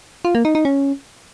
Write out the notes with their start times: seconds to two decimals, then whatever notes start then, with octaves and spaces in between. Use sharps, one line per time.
0.25 F4
0.35 A#3
0.45 D#4
0.55 D#4
0.65 C#4